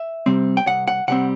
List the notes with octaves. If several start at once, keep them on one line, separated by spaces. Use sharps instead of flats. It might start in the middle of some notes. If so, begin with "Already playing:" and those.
Already playing: E5
C3 G3 C4
G5
C2 F#5
F#5
C3 G3 C4 F#5